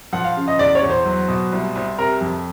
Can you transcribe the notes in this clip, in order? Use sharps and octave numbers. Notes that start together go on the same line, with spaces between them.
F3 F#5
F5
C#3
D#5
E2 D5
C#5
E2
C5
F#3
B2
C2
C2
C3 A#4
F2